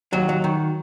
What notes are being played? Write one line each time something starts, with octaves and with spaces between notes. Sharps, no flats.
D#2 F#3 F#4
F#3
D#3